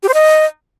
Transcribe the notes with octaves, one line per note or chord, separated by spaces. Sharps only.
G4
C5
D#5